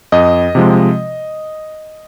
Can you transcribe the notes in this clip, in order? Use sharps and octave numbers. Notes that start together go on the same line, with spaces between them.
F2 D#5
C3 F3 G#3